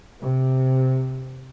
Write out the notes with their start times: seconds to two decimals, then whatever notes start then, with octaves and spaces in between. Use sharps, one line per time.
0.20 C3